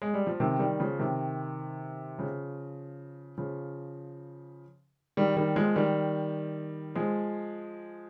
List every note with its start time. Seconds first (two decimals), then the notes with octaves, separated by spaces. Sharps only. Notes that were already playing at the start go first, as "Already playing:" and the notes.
0.02 G#3
0.14 G3
0.27 F3
0.40 C3 D#3
0.59 D#3 G3
0.80 C#3 F3
0.99 C3 D#3
2.19 C#3 F3
3.38 C#3 F3
5.17 D#3 G3
5.36 D#3 G3
5.56 F3 G#3
5.76 D#3 G3
6.95 F3 G#3